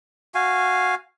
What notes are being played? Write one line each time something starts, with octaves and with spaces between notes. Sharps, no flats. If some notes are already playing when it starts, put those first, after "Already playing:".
F#4 F5 G#5